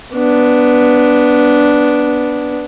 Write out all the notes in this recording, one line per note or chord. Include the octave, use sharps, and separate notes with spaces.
B3 D4